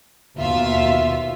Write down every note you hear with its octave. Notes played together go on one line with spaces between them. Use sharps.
D#2 B2 F4 E5